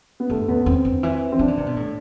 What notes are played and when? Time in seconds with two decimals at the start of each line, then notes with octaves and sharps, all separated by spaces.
0.20 B3
0.30 G2 A3
0.41 A3
0.48 E2 B3
0.66 E2 C4
0.85 D3
1.03 E3
1.32 C4
1.39 F3 D4
1.48 E3
1.57 C3
1.66 B2
1.77 A2